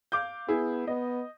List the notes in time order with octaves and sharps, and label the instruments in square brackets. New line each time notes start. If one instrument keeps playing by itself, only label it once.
[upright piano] F5 D6 G6
[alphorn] B3 [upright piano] E4 G#4
[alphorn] B3 [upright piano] D#5